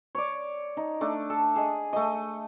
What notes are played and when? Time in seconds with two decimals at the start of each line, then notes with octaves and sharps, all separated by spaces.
0.15 C#5 D5
0.77 D#4
1.01 A3 D4
1.30 A4
1.56 G#4 D#5
1.93 A3 D#5